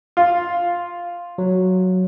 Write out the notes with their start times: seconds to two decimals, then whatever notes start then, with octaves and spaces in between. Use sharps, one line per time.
0.17 F4
1.38 F#3